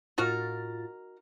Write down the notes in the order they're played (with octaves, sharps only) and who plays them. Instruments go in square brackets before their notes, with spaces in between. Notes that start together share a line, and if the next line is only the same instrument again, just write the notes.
[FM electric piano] A2 F4 A6 [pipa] D#4 F#4 A#4